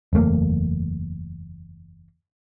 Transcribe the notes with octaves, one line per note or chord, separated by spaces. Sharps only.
F#1 E2 A3 A#3